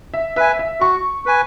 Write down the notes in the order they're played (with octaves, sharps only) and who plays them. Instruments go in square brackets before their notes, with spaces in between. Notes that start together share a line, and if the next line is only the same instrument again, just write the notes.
[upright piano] E5
[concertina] B4 G#5 [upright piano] E5
[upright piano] E5
[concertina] F#4 [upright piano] C#6
[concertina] B4 G#5